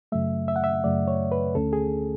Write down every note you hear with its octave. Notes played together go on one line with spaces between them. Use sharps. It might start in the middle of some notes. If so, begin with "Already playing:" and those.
F#2 C#3 F#3 A3 E5
E5
F#5
E5
F#2 C#3 F#3 A3 D5
C#5
B4
D2 D3 A3 C#4 A4
G#4